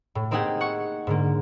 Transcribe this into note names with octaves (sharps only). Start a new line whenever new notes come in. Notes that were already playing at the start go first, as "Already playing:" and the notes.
A2
A#3 C4 D#4 G4 G#4 F#5
F#5 C#6 C#7
G#2 D3 A#3